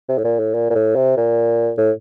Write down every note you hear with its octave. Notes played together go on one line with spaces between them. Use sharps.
C3
A2
A#2
A2
A#2
A#2
A2
C3
A#2
A2